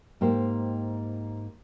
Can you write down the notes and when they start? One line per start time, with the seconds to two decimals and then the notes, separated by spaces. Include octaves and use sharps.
0.21 G#2 A#3 G4 C5